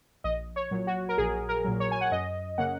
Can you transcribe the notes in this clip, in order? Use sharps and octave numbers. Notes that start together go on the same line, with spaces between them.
A#1 D#5
C#5
A#2 F#3
F#4
A#4
A#1 G#4
A#4
A#2 F#3
C#5
G#5
F#5
F#2 D#5
C#3 A#3 C#4 F#5